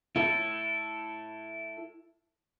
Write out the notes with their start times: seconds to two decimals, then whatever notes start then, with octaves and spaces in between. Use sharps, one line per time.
0.16 E4 A4